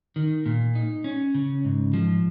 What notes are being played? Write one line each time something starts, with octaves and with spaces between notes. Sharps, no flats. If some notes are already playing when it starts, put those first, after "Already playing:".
D#3
A#2
D#4
C#4
C#3
G#2
F3